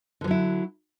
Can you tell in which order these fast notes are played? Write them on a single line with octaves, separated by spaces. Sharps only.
D3 F3 F#3 E4